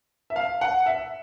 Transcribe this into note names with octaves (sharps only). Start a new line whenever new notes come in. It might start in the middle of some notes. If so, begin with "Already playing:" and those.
E5
F5
F#5
E5